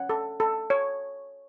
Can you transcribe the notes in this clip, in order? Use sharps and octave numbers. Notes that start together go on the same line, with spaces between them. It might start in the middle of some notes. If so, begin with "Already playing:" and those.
Already playing: C#4 F#5
A4
A4
C#5